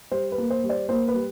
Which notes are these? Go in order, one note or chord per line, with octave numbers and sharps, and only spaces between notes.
G3 C5
B4
A#3
C5
G3
C5 D5
A#3 C5
B4
G3